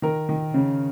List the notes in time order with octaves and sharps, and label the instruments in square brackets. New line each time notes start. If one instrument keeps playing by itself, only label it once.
[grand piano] D#3 A#4
D#3
C#3